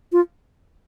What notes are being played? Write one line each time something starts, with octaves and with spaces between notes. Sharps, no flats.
F4